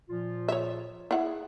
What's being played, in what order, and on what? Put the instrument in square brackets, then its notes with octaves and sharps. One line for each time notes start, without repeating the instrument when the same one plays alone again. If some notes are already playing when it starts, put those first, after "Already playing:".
[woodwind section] A#2 F3 F4
[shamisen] C#5 E5
[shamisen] E4 E5 F#5 [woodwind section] G#4